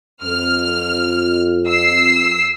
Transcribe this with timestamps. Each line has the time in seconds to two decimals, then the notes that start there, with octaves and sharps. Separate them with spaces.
0.23 F2 F6
1.67 E6 C7